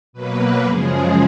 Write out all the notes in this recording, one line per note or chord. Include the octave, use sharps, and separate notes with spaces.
B2 F#3 A#3 B4
F#2 C#3 F3 G#3 G#4